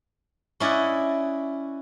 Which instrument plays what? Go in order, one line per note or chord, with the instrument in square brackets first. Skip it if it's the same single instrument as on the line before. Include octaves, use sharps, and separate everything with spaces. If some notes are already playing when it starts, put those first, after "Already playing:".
[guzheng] C#4 E4 D5 D#5 F#5